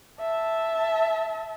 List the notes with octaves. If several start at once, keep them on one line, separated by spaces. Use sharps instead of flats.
E5 A5